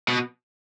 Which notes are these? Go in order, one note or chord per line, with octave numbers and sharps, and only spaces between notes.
B2